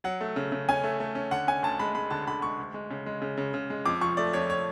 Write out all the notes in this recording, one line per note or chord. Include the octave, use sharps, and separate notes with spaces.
F#3 F#5
A3
C#3
C#3
C#4 G#5
A3
A3
C#4
D3 F#5
C#4 G#5
D2 A5
G#3 B5
G#3 B5
D3 A5
D3 B5
G#3 C#6
D2
G#3
C#3
G#3
C#3
C#3
C#3
G#3
F2 D6
F3 C#6
A3 D5
F2 C#5
C#5